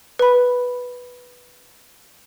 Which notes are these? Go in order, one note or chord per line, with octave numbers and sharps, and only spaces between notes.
B4 B5